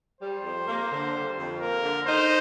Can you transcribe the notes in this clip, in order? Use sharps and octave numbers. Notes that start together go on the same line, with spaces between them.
G3 C5
F2
A#3
D3
G3
F2
A#3 A#4
D3
D#4 C5